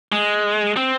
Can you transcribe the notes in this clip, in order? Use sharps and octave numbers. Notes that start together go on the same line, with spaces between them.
G#3
C4